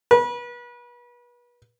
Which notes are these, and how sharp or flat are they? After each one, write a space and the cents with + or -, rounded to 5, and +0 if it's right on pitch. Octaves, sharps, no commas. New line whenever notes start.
B4 -35